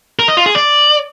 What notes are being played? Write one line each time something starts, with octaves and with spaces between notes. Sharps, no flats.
A#4
D#5
F4
G#4
D5